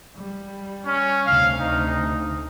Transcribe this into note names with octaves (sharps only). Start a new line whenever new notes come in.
G3
C#4
D2 C3 F5
D#4